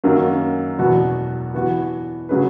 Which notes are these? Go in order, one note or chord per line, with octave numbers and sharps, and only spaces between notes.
F#2 D#3 F#3 A#3 C#4
E2 B2 F#3 B3 F#4
E3 B3 F#4
C#3 F#3 C#4 G#4 B4